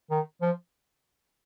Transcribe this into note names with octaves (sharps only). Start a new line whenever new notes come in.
D#3
F3